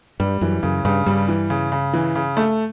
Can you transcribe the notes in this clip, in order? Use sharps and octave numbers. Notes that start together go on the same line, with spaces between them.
G2 G3
F#2 E3
F#2 C#3
G2 C#3
G2 G3
E3
C#3
C#3
E3
C#3
A3